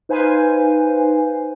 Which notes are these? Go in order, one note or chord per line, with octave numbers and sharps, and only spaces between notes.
D#4 B4 C5 F5 G#5